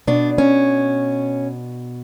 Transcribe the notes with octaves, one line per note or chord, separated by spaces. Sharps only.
B2 D4
C#4